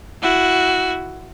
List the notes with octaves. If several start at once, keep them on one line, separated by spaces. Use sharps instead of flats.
E4 F#4